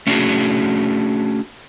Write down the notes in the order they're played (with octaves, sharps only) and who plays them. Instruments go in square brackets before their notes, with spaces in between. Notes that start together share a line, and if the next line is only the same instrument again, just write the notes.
[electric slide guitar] A3 C#4 D4 F4 F#4 G#4